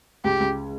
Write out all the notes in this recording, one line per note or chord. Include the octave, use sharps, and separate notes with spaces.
C#2 G4
C#2